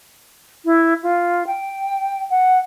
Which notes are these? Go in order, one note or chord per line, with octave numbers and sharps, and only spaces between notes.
E4
F4
G5
F#5